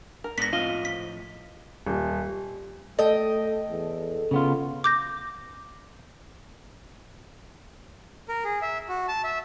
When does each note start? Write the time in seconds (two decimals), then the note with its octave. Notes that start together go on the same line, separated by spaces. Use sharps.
0.24 A#4
0.38 G#2 B3 D4 A#6 B6
0.53 F2 A2 C4 F4 D#5
0.85 B6
1.87 D#1
2.99 A3 A4 D#5 G5
3.71 E2
4.31 C#3 B3 F4
4.84 D6 G6 A#6
8.28 A#4
8.44 G#4
8.62 E5
8.89 F#4
9.08 A5
9.24 E5